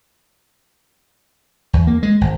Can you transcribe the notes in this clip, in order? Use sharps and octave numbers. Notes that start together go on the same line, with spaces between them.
E2
A#3
G#3
G#1